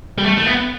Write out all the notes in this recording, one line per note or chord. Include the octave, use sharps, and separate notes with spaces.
G3
A3
A3
B3